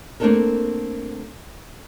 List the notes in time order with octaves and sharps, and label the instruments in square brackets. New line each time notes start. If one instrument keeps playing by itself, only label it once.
[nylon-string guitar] A3 A#3 C4 D4 A4 A#4